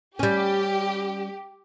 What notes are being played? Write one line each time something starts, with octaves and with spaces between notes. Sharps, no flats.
G3 C#4 G4